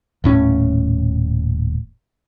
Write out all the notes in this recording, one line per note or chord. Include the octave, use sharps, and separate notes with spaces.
D#1 A2 C#4